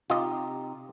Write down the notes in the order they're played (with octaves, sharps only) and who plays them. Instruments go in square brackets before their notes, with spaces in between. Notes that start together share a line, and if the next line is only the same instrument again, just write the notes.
[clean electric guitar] C3 D#4 G4 [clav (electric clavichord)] F4 D#5